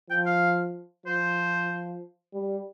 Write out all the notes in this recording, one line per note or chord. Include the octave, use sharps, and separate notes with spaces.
F3 G5
F5
F3 C5
G3